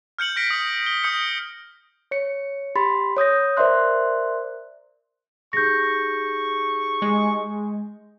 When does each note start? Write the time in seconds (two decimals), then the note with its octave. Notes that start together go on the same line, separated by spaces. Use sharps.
0.19 F6 G6 C#7 F#7
0.36 F6 A#6 B6 D7
0.50 D#6
0.86 G7
1.04 D#6 G6 C#7
2.11 C#5 C#7
2.75 G4 B5 C6 A6
3.17 C#5 D#6 G6 A#6
3.57 A#4 C5 D5 E5 C6 F#6
5.53 D#4 G4 G#4 C#6 G6 A#6
7.02 G#3